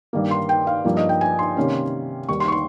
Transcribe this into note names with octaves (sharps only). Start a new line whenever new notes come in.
G2 D#3 A#3
C6
G5
F5
G2 F3 A#3
D#5
G5
G#5
C6
C3 D#3 A#3 C#4
D#2 D#3 G3 C#6
C6
C#6
C6